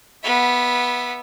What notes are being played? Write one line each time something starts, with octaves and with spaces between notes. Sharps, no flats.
B3 E5